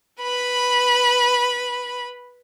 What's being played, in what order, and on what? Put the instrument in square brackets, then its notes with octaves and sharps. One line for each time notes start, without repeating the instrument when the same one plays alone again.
[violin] B4 B5